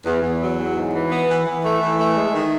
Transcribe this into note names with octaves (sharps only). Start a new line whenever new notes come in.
E2
E2
F#3
E2
G#2
E3
B3
E3
E3
A3
E3
A3
G#3
D#3